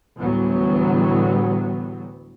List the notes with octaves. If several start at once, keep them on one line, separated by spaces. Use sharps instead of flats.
D2 A2 E3 F#3 G3 B3